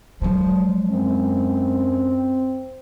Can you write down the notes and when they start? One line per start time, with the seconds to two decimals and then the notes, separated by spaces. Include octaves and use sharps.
0.22 F3 F#3 G#3
0.90 F#2 C4